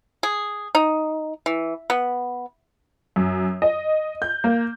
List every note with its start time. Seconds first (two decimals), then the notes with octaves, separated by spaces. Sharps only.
0.23 G#4
0.75 D#4
1.46 E3
1.90 B3
3.16 F#2
3.62 D#5
4.22 G6
4.44 A#3